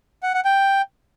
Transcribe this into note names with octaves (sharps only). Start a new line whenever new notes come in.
F#5
F#5
G5